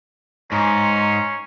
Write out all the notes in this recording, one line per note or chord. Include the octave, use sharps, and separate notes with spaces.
G#2 C#4 A#5 C6